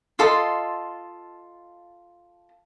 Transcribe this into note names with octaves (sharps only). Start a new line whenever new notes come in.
F4 A4 D#5 C6